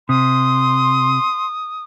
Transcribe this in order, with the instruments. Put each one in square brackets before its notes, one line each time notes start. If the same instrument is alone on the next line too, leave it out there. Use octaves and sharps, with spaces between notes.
[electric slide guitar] C3 [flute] C6 [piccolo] D#6